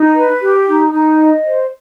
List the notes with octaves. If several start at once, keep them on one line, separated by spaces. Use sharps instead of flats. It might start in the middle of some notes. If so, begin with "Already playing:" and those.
Already playing: D#4
B4
G4
D#4
D#4
D#5
C5